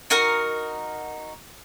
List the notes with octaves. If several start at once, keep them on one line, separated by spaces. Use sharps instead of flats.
D#4 F#4 A#4